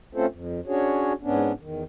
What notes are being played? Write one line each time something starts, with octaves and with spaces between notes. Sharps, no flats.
A3 C4 C#4 F4 A4 C5
F2
C#4 D4 F#4 G#4 C#5
G#2 B3 C#4 D4
E2 D#3